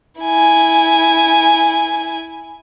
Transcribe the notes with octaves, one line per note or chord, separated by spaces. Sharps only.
E4 G#5